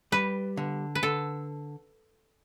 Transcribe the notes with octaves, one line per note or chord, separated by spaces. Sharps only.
G3 B4
D3
B4
D3 A4